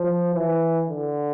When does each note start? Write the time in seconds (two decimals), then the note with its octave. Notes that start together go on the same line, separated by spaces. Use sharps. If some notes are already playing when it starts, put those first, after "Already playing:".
Already playing: F3
0.35 E3
0.89 D3